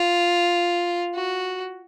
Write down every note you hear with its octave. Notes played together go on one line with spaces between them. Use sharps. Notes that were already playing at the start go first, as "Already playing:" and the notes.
Already playing: F4
F#4